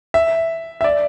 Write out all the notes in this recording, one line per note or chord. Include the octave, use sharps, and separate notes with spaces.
E5
E5
D5